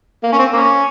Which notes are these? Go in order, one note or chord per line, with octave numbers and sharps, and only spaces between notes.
A#3
C#4
C4
A#3 C#4